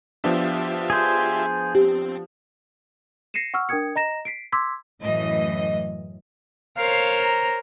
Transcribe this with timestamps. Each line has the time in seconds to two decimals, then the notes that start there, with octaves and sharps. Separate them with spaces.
0.24 F3 B3 D4 F4 G4 E5
0.90 G#4 C5
1.75 C4 G4
3.34 A#6 C7 C#7 D#7 E7
3.54 F#5 C#6 E6 F6
3.69 D4 A#4 G5 D#6 G#6 C#7
3.96 D#5 A#5 A#6 E7
4.25 B6 C7 D7
4.52 C6 D6 E6 G#6 B6
5.01 F#2 A2 E3 D#5
6.77 A#4 C5 C#5 F5
7.23 A#5